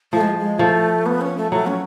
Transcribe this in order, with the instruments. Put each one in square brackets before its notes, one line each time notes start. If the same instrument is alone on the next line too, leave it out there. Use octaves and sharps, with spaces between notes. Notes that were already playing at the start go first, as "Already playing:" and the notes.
[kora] F3 [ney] A3
[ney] G#3
G#3
[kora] F3 [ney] A3
[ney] B3
C#4
A3
[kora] F#3 [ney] A3
[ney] C#4